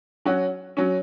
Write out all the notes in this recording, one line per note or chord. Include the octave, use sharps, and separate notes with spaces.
F#3 C#4 F#4
F#3 C#4